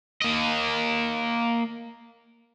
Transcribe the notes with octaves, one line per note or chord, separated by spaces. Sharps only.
A#3 D#5